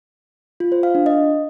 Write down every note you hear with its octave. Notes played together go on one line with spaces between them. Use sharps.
F4
C5
F5
D4
D#5